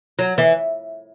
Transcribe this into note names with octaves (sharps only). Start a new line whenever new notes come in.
F#3
E3